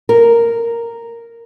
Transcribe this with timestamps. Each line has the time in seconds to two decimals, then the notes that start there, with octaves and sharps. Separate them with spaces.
0.09 A#4